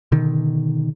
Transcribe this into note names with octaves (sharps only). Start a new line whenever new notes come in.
B2 D3 D#3